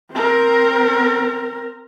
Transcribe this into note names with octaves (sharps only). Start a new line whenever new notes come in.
C4 A#4